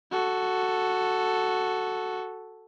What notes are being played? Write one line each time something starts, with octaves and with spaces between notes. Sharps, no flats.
F#4 A4